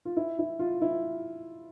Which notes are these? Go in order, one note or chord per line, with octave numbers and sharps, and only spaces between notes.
F4
E4
E4
F4
E4